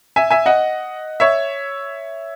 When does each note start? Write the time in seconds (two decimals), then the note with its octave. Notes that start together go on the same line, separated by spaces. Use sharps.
0.16 E5 G#5
0.31 E5 G#5
0.46 D#5 F#5
1.20 C#5 E5